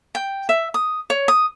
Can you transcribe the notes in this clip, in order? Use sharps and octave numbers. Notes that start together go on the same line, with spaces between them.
G5
E5
D#6
C#5
D#6